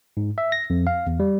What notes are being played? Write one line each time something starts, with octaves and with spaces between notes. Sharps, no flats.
G#2
E5
A#6
F2
F5
E2
G3